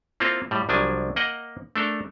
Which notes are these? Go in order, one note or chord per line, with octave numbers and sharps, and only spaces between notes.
A#3 C4 E4 F4 A4
A2 G3
C2 F3 F#3 D4 G#5
A#3 D#5 F#5 G5
A3 D4 A4 A#4